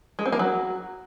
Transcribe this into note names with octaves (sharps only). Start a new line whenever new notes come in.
G#3
C4
A#3
F#3